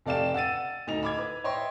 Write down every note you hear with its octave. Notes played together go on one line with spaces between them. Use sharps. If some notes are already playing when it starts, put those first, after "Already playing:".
F1 A4 D5 F5 G5 E7
F#5 E6 A6 D#7
D2 D#4 D#5 F7
B5 D6 G#6
B4
C#5 D#5 E5 G5 C6